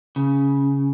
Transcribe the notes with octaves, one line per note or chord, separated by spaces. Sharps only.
C#3